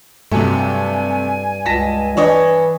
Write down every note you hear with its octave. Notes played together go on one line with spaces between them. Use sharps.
G2 C3 F#3 A3 G#5
C#2 A5 A#6 B6
E3 D4 C#5 D#5